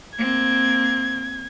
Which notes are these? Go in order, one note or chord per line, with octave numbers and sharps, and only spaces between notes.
A#3 C4 G#6